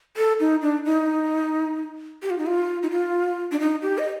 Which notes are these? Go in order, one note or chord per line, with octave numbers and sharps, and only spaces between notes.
A4
D#4
D4
D#4
G4
F4
D#4
F4
D#4
F4
D4
D#4
G4
D#5